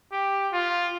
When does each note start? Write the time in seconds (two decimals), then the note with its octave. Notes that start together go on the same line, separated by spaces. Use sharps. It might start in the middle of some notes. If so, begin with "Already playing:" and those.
0.12 G4
0.53 F4